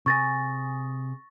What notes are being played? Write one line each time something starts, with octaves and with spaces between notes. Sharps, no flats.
C3 G#4 G#5 C#6 A6 A#6